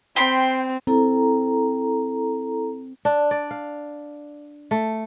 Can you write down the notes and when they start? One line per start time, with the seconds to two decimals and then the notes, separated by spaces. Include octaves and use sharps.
0.16 C4 G5 B5 C6
0.87 C4 E4 A4 A#5
3.05 D4
3.31 D5
3.51 F5
4.71 A3